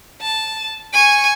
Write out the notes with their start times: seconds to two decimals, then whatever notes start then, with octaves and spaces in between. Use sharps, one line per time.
0.21 A5
0.93 G#5 C#6